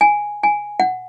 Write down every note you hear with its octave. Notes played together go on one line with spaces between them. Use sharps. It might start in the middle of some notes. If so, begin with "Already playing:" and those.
G#5
G#5
F#5